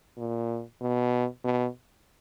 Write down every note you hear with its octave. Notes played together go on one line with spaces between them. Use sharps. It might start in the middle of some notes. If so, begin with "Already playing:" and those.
A#2
B2
B2